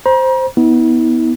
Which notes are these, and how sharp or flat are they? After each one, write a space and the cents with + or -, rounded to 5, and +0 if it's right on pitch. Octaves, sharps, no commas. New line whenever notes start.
C5 +0 A#5 +40
B3 +0 E4 -45